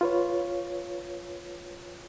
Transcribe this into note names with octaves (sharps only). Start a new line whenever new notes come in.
F4 B4 C#5